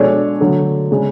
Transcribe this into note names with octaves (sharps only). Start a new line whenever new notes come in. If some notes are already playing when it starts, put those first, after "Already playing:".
Already playing: B2 G#3 D4 A4 C#5
D3 F#3 A3
C#3 G#3 D4